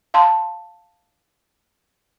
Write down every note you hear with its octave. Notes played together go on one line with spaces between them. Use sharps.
F5 A5 C6